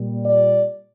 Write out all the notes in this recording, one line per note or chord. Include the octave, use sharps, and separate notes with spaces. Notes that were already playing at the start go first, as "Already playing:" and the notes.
Already playing: A#2 G3
D5